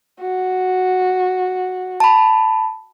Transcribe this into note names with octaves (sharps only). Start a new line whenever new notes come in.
F#4
A5 B5